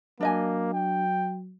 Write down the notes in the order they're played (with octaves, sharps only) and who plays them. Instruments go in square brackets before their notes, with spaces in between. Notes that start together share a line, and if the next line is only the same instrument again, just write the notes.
[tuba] F#3 [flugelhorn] A#3 [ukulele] D4 D#5 G#5
[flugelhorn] G5